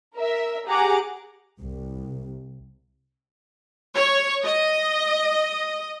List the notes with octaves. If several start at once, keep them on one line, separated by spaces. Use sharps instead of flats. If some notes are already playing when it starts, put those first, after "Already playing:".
A#4 E5
G4 G#4 F#5 A#5 D6
C2
C#5
D#5